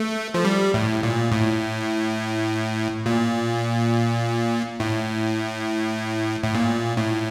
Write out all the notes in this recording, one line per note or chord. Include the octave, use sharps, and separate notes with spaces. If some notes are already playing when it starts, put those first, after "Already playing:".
Already playing: A3
F3
G3
A2
A#2
A2
A#2
A2
A2
A#2
A2